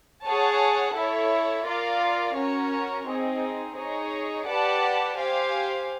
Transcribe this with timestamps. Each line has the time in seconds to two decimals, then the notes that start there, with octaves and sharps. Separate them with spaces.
0.24 G#4 C#5 F#5 A5
0.95 E4 A4 C#5
1.65 F4 A#4 D5 F5
2.35 C#4 F#4 A#4 C#5
3.06 C4 D#4 G#4
3.76 D#4 G#4 C#5
4.45 G4 B4 D5 F#5 A5
5.16 G4 C5 F5 G#5